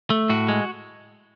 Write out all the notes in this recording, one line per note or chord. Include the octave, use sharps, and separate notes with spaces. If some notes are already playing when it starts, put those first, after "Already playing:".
A3
A2 F#4
G#3